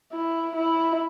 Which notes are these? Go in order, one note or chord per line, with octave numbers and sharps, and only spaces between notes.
E4
E4